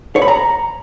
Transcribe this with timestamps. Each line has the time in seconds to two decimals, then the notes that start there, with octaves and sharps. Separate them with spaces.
0.16 C#5
0.22 B5
0.28 A#5